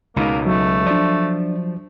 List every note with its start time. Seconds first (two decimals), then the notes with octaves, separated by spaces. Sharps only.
0.16 C#2 B2 G#3 A#3 D#4
0.47 F#3 A3
0.86 F3 D4 D5